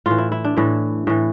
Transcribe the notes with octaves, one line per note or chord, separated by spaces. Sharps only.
A2 E3 F4
E4
E4
D4
A2 E3 E4
A2 E3